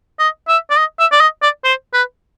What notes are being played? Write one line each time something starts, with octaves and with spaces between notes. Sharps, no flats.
D#5
E5
D5
D#5
E5
D5
D#5
D5
C5
B4